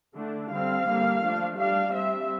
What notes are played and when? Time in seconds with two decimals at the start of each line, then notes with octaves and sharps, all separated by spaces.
0.16 D3 A3 D4
0.51 D3 G3 C4 F5
0.87 D3 G3 A#3
1.23 F3 A3 D4
1.58 G3 D4 F5
1.94 G3 C4 E5